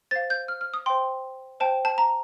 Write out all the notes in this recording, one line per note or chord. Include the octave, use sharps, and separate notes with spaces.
C5 F5 A6
G6
F6
F6
D#6
C5 G5 C6
C5 G5 A5
A5
A#5